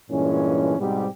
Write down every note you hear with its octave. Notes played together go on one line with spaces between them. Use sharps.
G2 A#2 E3 G#3 C#4
G#2 B2 G3 B3 C4 G4